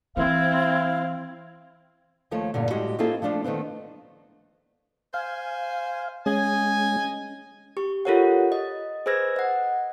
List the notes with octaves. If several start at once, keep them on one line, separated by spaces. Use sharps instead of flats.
E3 C4 E4 F5
D#2 F3 A3 C#5
E2 G2 A#2 D3
A2 G3 G#3 F#4 G4 F#5
A#3 C4 E4 F4 G#4 A4
F3 A3 D4 F4
D#3 A3 B3 C4
C5 F5 G#5
G#3 C#4 D#5 G#5
G4 C#6
F4 G4 A4 A#4 C#5 F#5
D#5
G#4 B4 C5 E6 G#6 A#6
D#5 F#5